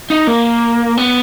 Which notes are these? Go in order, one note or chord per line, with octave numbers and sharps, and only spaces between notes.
D#4
A#3
B3